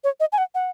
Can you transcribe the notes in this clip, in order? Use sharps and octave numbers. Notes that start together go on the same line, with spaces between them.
C#5
D#5
G#5
F#5
F#5